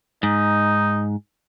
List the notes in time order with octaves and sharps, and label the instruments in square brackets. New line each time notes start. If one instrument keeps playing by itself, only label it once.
[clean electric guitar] G#2 [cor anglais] D#4